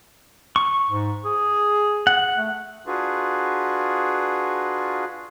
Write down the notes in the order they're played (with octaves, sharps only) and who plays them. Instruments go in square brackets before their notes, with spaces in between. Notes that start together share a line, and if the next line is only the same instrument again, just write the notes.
[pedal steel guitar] C#6
[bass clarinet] G#2
G#4
[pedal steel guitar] F#5
[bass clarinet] A3
[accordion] D4 F4 F#4 G#4 B4